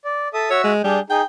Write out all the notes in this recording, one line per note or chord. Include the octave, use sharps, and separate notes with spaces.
D5
A4 E5 D#6
F#4 C#5 E5 E6
G#3
G3 D4 G#4 G6
D#4 G#4 G5